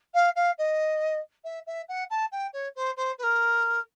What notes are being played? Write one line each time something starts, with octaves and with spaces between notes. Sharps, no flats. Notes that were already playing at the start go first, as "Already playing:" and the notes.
F5
F5
D#5
E5
E5
F#5
A5
G5
C#5
C5
C5
B4
A#4